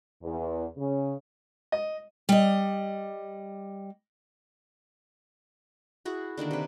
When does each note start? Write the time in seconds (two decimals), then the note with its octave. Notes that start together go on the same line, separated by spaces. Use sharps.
0.23 E2
0.77 C#3
1.72 D#5
2.29 G3 D#5
6.05 E4 F#4 G#4
6.38 D3 D#3 A#3 D4
6.51 C3 B4